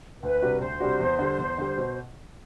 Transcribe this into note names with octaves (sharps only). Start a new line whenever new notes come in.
D2 B4
C3 G3 D4 F#4
D2 C5
C3 G3 D4 F#4
E2
D3 G3
E2
D3 G3
B2